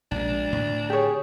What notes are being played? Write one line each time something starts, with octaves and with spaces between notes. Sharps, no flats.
A#1 G#3 D4
A2 D3
G4 G#4 C#5